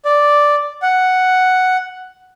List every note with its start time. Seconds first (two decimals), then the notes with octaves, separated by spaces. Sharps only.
0.05 D5
0.82 F#5